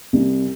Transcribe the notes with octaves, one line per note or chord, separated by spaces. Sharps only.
C2